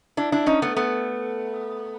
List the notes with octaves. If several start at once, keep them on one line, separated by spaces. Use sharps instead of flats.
D4 E4
D4 E4
C#4 D#4
A3 B3
A3 B3